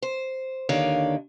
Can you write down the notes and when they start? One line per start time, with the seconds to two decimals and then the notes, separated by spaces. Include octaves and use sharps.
0.02 C5
0.69 D#2 D3 D#3 D4 C#5 F5